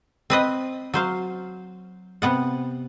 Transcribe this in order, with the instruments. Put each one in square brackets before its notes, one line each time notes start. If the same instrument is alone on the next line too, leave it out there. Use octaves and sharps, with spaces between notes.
[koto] C4 B4 D#5
F#3 C5 F5
C3 B3 F#5